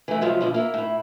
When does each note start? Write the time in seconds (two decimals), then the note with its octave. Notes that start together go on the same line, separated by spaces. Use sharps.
0.08 E3 A3
0.21 A2 C3 F3 F#3 G#3 A3
0.41 B2 D3 F3
0.54 A#3 E4 A#4
0.74 A2 E4